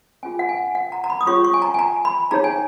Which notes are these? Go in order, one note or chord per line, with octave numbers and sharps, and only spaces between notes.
C#4 F4 G#4 G#5
F#5
G#5
F#5
A#5
A#5
B5
D#6
C#4 F4 G#4 C#5 C#6
C#6
G#5
A#5
G#5
A#5
B5
D#4 G#4 C#5 A#5
G#5